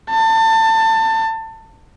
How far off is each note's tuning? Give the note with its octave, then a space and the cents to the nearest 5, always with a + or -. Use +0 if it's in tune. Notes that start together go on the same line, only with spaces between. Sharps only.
A5 +25